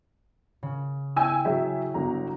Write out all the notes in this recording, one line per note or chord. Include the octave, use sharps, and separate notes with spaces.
C#3
E4 G5 G#5 E6
F#3 G#4 E5
G1 F#3 A#5